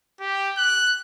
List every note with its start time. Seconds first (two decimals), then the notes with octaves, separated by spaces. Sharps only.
0.21 G4
0.57 F#6